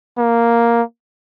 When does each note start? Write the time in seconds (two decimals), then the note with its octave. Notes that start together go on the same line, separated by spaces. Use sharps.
0.18 A#3